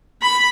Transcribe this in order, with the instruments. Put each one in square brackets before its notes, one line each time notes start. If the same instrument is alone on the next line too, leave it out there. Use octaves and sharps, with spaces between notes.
[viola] B5